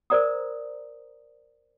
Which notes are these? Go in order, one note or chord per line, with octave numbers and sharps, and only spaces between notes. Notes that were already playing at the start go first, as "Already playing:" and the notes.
A#4 C5 D5 A#5 D#6